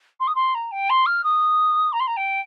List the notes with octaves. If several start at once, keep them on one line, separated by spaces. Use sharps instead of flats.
C6
D#6
C6
A#5
G5
C6
F6
D#6
A#5
C6
A#5
G5